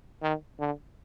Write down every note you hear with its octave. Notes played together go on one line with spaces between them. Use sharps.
D#3
D3